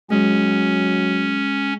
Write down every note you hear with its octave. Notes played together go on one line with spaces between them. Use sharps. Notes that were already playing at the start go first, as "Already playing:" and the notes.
F#3 G#3 C#4